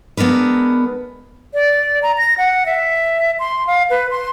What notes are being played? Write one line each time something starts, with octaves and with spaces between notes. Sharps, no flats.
G#3 B3 D4 A#4 B4
D5
A#5
A#6
F#5
E5
C6
F5
B4
C6